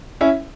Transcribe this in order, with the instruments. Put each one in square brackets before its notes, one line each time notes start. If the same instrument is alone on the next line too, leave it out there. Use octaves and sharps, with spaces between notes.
[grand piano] C#4 E4